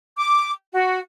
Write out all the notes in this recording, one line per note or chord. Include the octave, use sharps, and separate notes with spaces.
D6
F#4